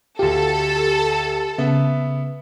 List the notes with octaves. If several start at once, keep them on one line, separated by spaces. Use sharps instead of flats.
D2 F4 G4 A4
C#3 B3 E5